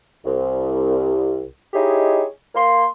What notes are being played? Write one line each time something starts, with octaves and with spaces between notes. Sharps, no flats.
C2
D#4 E4 G4 G#4 C#5 D#5
A#3 C6